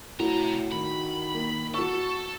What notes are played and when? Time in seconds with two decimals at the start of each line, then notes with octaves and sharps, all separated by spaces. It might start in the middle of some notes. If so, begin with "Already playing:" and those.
0.19 A2 C3 E4 F#4 A#5
0.72 D#3 B5
1.34 A#3
1.74 F#4 A4 C#6